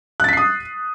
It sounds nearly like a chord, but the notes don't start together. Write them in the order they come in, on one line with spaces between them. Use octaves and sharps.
F#6 A6 B6 C7 D#6